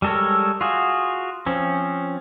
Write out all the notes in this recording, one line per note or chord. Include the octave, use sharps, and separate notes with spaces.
G3 G#3 A4 A#4 C#5
F4 F#4 G#4
F3 C4 C#4